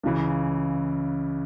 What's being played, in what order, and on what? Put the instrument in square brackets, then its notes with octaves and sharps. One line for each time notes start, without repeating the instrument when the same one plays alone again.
[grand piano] C#2 C#3 E3